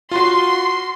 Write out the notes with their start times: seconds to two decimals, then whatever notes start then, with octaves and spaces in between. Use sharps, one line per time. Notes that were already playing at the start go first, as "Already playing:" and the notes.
0.11 F4 F#4 C6